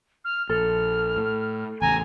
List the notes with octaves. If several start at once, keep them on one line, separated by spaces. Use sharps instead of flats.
F6
A#1 A4 F6
A2
A1 E2 C#3 G#5 A#5